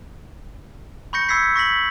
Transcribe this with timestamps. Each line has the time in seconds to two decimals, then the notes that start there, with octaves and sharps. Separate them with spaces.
1.13 B5 C#6 G6 A#6 C#7
1.29 B5 C#6 E6 G#6 B6 C7
1.56 C#6 A#6 B6 F#7